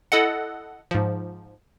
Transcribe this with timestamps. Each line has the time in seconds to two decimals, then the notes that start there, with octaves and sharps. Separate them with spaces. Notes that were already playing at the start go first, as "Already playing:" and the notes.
0.12 E4 A4 D#5 F#5
0.91 G#2 F3